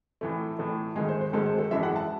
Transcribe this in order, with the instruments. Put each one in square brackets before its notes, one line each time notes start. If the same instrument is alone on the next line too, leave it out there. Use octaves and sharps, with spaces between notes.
[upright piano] A2 E3 A3
A2 E3 A3
G#2 D#3 G#3 G#4
C5
C5
G#2 D#3 G#3 A4
C5
A4
F#2 E3 G#3 E5
F#5
A5